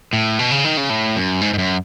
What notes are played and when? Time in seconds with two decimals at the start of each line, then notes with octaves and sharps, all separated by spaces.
0.13 A2
0.39 B2
0.51 C#3
0.64 D#3
0.77 C#3
0.90 A2
1.16 F#2
1.41 G#2
1.53 G#2
1.58 F#2